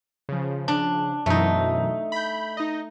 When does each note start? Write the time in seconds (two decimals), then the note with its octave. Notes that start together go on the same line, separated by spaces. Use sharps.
0.29 C#3 F3
0.68 D4
1.26 F#2 B2 E3 A3 D#4
2.12 B5 G6
2.57 D#4 D#5